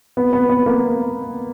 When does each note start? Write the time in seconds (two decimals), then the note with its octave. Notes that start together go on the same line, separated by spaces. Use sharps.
0.17 B3
0.33 B3
0.49 B3
0.66 A#3